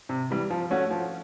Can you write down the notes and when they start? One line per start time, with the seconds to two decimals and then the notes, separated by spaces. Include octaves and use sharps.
0.09 C3
0.30 E3 G3
0.50 F3
0.71 A3 C#4 F#4
0.91 F3